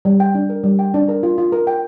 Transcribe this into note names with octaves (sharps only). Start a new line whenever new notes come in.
G3
G5
D4
A#4
G3
G5
D4
A#4
F4
F4
A#4
G5